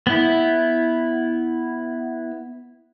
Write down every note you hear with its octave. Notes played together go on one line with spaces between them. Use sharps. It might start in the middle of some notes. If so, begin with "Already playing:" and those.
B3 E4